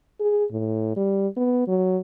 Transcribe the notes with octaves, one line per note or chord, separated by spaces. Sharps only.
G#4
A2
G3
B3
F#3